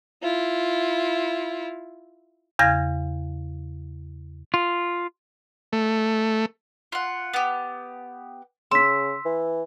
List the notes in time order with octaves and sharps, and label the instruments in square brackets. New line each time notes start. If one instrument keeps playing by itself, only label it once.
[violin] E4 F4
[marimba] E2 C#3 F5 G#6 A#6
[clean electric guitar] F4
[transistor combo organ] A3
[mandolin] F4 F#5
B3 G4
[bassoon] C#3 [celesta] C6 B6 [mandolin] E6
[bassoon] E3